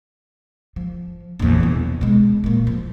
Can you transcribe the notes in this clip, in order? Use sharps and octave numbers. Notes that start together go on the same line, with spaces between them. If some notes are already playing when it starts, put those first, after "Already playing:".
F3
A#1 E2
C2 B2
B2 G#3
A#2 A#3
F3